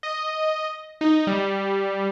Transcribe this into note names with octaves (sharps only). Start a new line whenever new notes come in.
D#5
D#4
G3